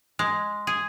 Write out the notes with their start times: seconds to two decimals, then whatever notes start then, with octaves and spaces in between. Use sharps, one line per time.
0.19 G#3
0.67 G#4